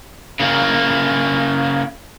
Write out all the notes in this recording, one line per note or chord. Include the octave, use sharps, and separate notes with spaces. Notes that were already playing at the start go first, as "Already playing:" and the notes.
C#3 A#3